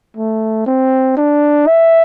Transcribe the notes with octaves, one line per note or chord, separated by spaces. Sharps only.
A3
C4
D4
E5